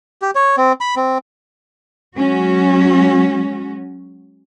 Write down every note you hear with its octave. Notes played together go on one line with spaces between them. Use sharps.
G4
C#5
C4
B5
C4
F#3 G#3 C#4 F#4